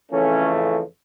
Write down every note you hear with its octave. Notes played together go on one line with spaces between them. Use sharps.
F2 C#3 E3 A3 C#4